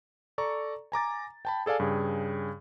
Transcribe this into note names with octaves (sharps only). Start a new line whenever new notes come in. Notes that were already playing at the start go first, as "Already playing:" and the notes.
A4 D5 A#5 C#6
G#5 A#5 D6 A6
G5 A5 B5
G#4 A4 D5 F5 G#5
G2 C#3 G#4 G5